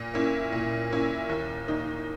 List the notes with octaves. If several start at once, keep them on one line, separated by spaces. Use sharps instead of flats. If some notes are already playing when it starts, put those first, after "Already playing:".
Already playing: A#2
A#3 C#4 E4
A#2
A#3 C#4 E4
D#2
D#3 A#3 D#4